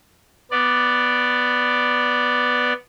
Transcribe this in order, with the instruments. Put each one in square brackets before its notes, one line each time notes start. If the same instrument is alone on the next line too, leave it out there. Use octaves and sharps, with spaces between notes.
[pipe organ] B3 D5